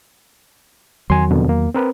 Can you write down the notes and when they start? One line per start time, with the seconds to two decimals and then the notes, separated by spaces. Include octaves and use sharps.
1.10 E2 D#3 F#3 G#5 C6
1.31 F2 B2 D3
1.49 A#3
1.74 C4 A#4 B4